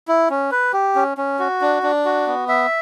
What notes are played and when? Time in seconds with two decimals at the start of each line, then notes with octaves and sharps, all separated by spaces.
0.08 E4
0.30 C#4
0.52 B4
0.73 G4
0.96 C#4
1.18 C#4
1.39 F#4
1.61 D4
1.83 D4
2.05 F#4
2.27 B3
2.48 E5